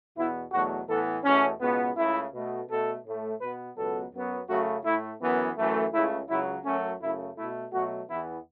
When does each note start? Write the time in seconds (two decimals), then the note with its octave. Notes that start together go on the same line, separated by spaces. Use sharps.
0.17 E2 B2 B3 E4
0.52 E2 B2 F#3 A3 F#4
0.88 A2 E3 B3 A4
1.24 E2 B2 A3 C#4
1.61 C#2 B2 B3
1.97 C#2 C#3 A3 E4
2.33 B2 A3
2.69 B2 A3 A4
3.05 A2 A3
3.40 B2 B3 B4
3.77 C#2 B2 F#3 B3 A4
4.13 F#2 F#3 B3
4.49 F#2 C#3 F#3 A3 F#4
4.85 A2 A3 E4
5.21 F#2 E3 B3
5.57 F#2 E3 A3
5.93 C#2 C#3 A3 E4
6.29 C#2 C#3 F#3 E4
6.65 F#2 F#3 A3 C#4
7.01 F#2 C#3 A3 E4
7.37 B2 A3 E4
7.73 B2 F#3 A3 F#4
8.09 E2 E3 B3 E4